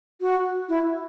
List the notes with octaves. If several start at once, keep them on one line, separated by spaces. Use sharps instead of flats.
F#4
E4